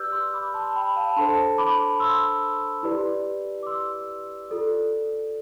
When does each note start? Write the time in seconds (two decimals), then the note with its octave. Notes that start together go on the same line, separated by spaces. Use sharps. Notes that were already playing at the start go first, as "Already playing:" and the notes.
Already playing: G4 B4 D5 D6 E6 F6 G6
0.12 C6 E6
0.34 B5 D6
0.54 A5 C6
0.76 G5 B5
0.96 F5 A5
1.16 D4 A4 C5 A5 C6
1.58 B5 D6
2.00 C6 E6
2.83 E4 G4 B4 D5
3.63 D6
3.66 C6 E6
4.50 F4 A4 D5